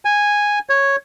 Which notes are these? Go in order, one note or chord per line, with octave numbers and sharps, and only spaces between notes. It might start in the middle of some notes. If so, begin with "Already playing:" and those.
G#5
C#5